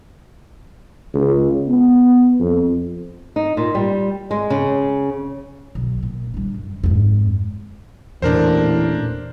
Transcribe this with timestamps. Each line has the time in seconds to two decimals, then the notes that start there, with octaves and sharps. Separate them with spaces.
1.14 C#2
1.68 B3
2.40 F2
3.36 D#4
3.57 A#2
3.75 G3
4.31 G#3
4.50 C#3
5.75 B1
6.03 A#2
6.34 G3 D4
6.54 F#2
6.84 F2 G#2
8.22 A1 E2 A#2 D4 A#4 C5